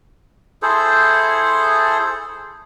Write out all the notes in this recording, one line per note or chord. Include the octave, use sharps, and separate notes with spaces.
E4 G#4 A4 C5